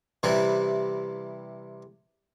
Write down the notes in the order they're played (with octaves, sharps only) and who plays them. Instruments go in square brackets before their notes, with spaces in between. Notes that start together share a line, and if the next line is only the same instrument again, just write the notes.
[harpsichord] C3 E3 G3 E4